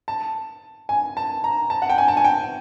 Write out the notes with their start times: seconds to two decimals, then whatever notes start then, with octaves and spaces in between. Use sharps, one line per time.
0.08 A5
0.89 G#5
1.17 A5
1.44 A#5
1.70 A5
1.82 F#5
1.90 G5
1.98 G#5
2.08 A5
2.17 G#5
2.24 G5